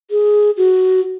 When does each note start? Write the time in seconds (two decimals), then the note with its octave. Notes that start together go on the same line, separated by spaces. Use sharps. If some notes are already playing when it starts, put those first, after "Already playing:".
0.11 G#4
0.57 F#4